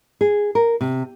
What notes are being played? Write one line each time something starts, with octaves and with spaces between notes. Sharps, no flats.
G#4
A#4
C3